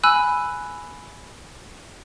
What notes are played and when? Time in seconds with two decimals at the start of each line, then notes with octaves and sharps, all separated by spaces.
0.04 G#5 B5 E6 F#6